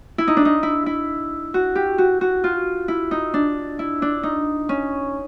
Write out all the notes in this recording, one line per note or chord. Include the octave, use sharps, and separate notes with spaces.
E4
D#4
D4
D#4
E4
E4
F#4
G4
F#4
F#4
F4
E4
D#4
D4
E4
D4
D#4
C#4